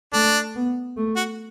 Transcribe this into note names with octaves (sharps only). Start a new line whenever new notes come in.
A3 D4
B3
A3
F#4